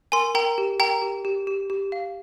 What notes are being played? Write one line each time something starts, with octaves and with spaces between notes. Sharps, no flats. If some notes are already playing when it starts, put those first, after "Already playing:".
A#4 G#5 C6
A#4 G5 A#5
G4
A#4 G5 A#5
G4
G4
G4
G4
F5